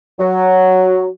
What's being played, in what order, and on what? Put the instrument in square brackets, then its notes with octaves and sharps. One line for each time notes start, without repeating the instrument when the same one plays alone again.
[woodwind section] F#3